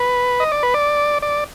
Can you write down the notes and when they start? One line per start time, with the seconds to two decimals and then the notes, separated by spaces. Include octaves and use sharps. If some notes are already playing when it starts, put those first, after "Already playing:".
Already playing: B4
0.40 D#5
0.52 D5
0.63 B4
0.74 D5
1.22 D5